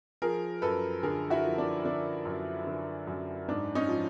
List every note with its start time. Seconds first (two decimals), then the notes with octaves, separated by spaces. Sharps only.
0.22 F3 G#4 A#4
0.62 F#2 A4 B4
1.03 D3 G#4 A#4
1.30 E4 F#4
1.43 F3
1.58 D4
1.85 D3 D4
2.25 F#2
2.67 D3
3.07 F#2
3.48 G#2 D4
3.75 C#4 D#4
3.88 F3